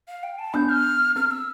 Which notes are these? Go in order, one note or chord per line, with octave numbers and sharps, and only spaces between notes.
F5
G5
A5
B3 D4 G6
F6
C4 F6
E6